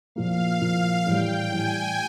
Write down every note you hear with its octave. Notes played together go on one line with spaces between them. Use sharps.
A#2 F3 A#3 F5
A#2 F3 A#3 F5
A2 E3 G3 G5
A2 E3 G3 G#5